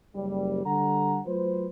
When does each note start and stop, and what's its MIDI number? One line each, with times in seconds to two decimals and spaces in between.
0.15 0.65 30
0.15 0.65 55
0.66 1.19 50
0.66 1.19 55
0.66 1.19 69
0.66 1.19 78
0.66 1.19 82
1.26 1.67 54
1.26 1.67 57
1.26 1.67 65
1.26 1.67 71
1.26 1.67 72